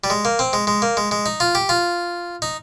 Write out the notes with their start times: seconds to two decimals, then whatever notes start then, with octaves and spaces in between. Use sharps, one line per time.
0.04 G3
0.10 G#3
0.25 A#3
0.39 C4
0.53 G#3
0.67 G#3
0.82 A#3
0.97 G#3
1.11 G#3
1.26 D#4
1.40 F4
1.55 G4
1.69 F4
2.42 D#4